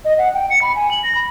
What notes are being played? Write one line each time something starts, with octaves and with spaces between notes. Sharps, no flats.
D#5
F#5
G5
C#7
B5
G#5
F#7
A#6
B5